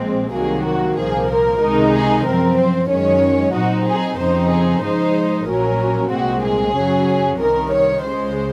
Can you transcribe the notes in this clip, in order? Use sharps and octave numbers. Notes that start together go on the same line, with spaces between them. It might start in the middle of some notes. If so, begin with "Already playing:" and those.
Already playing: A#1 A#2 G#3 C4
C2 C3 D#3 F#3 A#3 G#4
F#4
C2 A#2 F3 A#3 G#4
A#4
C#2 C3 D#3 G#3 D#4
G#4
F#2 F3 C4 A#4
C5
F#2 D#3 G#3 C#4 C#5
A#2 F#3 C4 D#4 F#4
G#4
F2 C#3 F3 C4 D#4 C5
G#4
G#2 F3 G#3 D#4 C5
A#1 A#2 F#3 C#4 A#4
C2 A#2 G#3 C4 F#4
G#4
F#2 C#3 F#3 C#4
C2 C3 D#3 A#4
C#5
C#2 C#3 G#3 C5